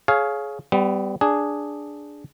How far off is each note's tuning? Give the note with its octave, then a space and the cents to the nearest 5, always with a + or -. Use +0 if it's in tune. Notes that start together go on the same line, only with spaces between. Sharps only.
G#4 +25 C#5 +0 F5 +0
G3 +0 B3 +35
D4 +0 G#4 +0